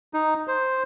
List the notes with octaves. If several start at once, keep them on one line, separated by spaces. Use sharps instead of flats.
D#4
C5